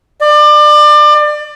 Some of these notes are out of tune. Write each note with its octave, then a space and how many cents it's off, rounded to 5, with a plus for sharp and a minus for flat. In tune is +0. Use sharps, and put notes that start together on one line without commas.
D5 +30